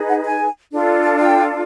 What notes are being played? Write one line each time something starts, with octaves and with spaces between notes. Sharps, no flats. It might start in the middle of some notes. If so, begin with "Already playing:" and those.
Already playing: D#4 G#4 B4
F#5
G#5
D4 F4 A4
A5
G5